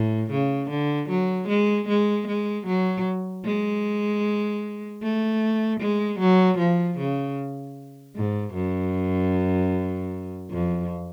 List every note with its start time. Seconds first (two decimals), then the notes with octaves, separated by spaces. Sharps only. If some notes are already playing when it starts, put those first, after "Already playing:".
Already playing: A2
0.31 C#3
0.70 D3
1.09 F#3
1.49 G#3
1.89 G#3
2.27 G#3
2.66 F#3
3.45 G#3
5.02 A3
5.80 G#3
6.19 F#3
6.58 F3
6.98 C#3
8.16 G#2
8.54 F#2
10.51 F2